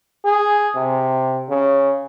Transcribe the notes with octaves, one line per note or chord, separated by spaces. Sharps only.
G#4
C3
C#3